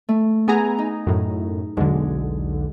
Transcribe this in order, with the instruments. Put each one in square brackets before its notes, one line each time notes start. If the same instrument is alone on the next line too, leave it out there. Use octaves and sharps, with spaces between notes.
[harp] A3
[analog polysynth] B3 G#5 A#5 [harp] E4 G#4
[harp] D#4
[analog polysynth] F#2 A2
[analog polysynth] B1 E2 D3 [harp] G#3